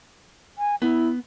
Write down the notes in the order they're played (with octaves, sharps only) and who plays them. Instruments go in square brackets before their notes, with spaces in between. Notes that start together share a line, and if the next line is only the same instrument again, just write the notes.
[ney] G#5
[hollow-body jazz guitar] B3 [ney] E4